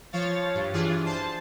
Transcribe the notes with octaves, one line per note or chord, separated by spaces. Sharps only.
F3 C#5 F5 A6
G2
E3 D4 F4 G#4
C5 A5